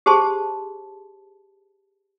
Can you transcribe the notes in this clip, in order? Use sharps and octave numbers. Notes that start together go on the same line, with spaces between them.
G4 G#4 C5 A5 C6